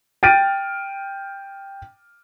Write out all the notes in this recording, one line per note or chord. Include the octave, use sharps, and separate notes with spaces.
G5 F6 A6 D7 D#7